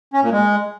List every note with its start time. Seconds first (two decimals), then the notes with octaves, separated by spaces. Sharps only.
0.13 C#4
0.23 A#2
0.32 G#3